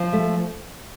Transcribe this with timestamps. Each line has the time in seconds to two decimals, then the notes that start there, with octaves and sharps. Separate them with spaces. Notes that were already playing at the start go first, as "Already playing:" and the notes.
Already playing: F3
0.13 A3